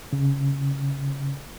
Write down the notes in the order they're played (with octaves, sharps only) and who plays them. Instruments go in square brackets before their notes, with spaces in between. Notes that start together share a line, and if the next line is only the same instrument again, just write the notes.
[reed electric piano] C#3